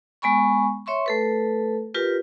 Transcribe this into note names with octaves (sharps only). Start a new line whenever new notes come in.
G#3 B3 G#5 B5 C#6
C#5 E5 C6 C#6
A3 A4 B4
F4 G4 A#4 B4